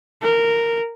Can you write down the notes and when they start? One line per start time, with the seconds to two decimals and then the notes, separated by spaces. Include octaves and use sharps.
0.22 A#4